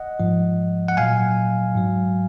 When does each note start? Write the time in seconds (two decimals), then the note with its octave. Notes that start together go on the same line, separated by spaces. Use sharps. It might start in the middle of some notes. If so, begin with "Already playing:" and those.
Already playing: D#5 F#5
0.20 G#2 F3
0.88 F#5
0.97 A#2 F#3 F5 G#5
1.75 G#2 F#3